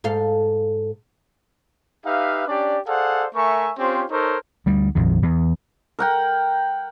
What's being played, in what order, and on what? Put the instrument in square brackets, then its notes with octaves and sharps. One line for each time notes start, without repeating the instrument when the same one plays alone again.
[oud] G#2 A4 F5
[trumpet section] D#4 G4 B4 E5 F5
C#4 D4 G4 D5
G#4 A4 C5 D5 F5 F#5
A3 A#4 E5 G#5 C#6
C4 C#4 F4 G4 C5
D#4 A4 A#4 C5 C#5
[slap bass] D2 G3
A#1 F2 D#3
E2
[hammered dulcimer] A#4 F#5 G5